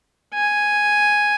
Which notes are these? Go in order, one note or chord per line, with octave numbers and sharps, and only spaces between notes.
G#5